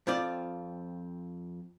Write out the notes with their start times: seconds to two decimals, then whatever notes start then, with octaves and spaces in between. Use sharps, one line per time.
0.07 F2 C4 F4 D5